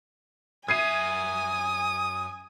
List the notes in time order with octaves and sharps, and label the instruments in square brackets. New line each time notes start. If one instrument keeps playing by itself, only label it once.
[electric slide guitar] F#2 E5 [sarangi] G#5 [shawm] D#6 [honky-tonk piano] G#6 C7 D#7